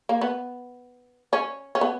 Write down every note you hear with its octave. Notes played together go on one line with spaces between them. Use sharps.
A#3
B3
C#4
C#4
B3